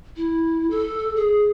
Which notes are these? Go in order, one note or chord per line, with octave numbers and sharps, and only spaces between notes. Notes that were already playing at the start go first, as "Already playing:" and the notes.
E4
A4
G#4